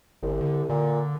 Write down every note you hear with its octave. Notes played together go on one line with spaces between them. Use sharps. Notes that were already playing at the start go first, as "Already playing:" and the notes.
G1 C2
D3
A#2 D3